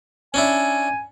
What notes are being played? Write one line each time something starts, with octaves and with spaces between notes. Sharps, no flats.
C#4 D4 E4 G#5